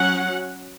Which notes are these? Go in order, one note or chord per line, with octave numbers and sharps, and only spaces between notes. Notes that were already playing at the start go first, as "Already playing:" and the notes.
Already playing: F#3 C#4 F#5